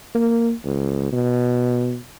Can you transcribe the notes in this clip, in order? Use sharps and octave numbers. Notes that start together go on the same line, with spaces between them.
A#3
C#2
B2